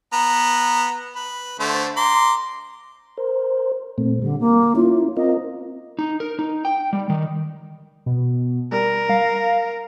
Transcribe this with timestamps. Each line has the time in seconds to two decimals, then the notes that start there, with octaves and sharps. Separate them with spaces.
0.13 B3 A#5
1.16 B4
1.60 D3 A3 C5
1.97 A#5 C6 D6
3.18 A#4 C5
3.98 A#2 A3 C4
4.22 D3 G3
4.40 A#3
4.76 C#4 E4 F4
5.17 C4 F4 A#4 D#5
5.99 D#4
6.20 A#4
6.39 D#4
6.65 G5
6.93 G3
7.10 D#3
8.06 B2
8.72 G3 A#4
9.09 F5